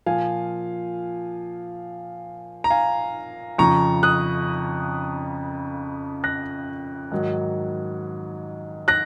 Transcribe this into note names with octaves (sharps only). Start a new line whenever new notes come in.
A#2 F3 F5 G#5
A#5
F5 G#5
F2 C#3 F3 A#5 C#6
D#6 F#6
F#6 A#6
G#2 D#3 F#3
F#6 A#6